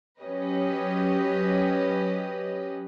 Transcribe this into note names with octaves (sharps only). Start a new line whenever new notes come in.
F#3 C#4 G4 B4 D#5